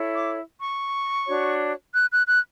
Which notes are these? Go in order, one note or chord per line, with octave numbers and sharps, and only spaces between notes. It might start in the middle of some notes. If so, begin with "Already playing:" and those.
Already playing: E4 A4 C#5
D6
C#6
D4 F#4 C#5
F#6
F#6
F#6